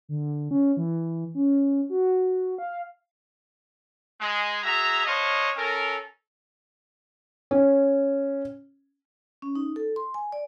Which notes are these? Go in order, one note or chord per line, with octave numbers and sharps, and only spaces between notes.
D3
C#4
E3
C#4
F#4
F5
G#3
F#4 G#4 E5 A#5
D4 C5 C#5 D#5 F5
C#4 A4 A#4
C#4
C#4
D#4
A4
C6
G#5
D5